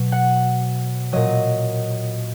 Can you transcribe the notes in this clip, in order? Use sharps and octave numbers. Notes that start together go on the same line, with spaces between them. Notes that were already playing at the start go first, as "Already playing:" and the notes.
Already playing: B2 F#3
F#5
A#2 F#3 D#5